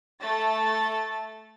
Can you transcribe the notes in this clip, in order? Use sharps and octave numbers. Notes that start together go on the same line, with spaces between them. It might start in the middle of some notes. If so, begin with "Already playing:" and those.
A3 A6